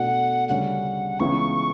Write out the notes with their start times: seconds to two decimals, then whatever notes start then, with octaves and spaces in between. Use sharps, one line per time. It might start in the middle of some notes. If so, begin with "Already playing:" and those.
Already playing: B2 A3 D4 A4 F#5
0.49 D2 C#3 G3 C#4 F#5
1.20 C#2 C#3 E3 B3 E4 C#6